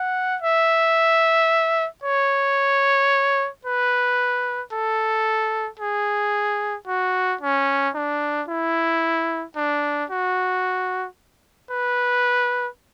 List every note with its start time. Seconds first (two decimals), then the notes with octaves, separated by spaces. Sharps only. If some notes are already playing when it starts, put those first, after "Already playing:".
Already playing: F#5
0.42 E5
2.03 C#5
3.65 B4
4.72 A4
5.79 G#4
6.87 F#4
7.41 C#4
7.95 D4
8.48 E4
9.56 D4
10.10 F#4
11.71 B4